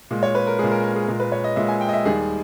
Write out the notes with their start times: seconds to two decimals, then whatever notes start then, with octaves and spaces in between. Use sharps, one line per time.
0.11 A#2 G#3
0.23 C#5
0.35 B4
0.47 A#4
0.59 A#2 G#3 G#4
0.71 A#4
0.83 A#4
0.96 G#4
1.08 A#2 G#3 A#4
1.20 B4
1.32 C#5
1.44 D#5
1.56 A#2 G#3 E5
1.68 G#5
1.81 G5
1.89 D#5
1.93 E5
2.05 D#2 D#3 G3 G#4